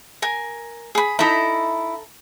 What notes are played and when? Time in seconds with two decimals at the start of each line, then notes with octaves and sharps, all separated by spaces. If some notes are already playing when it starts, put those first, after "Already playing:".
0.22 A#4 G#5
0.95 G#4 B5
1.19 D#4 E4 A4 E5 A#5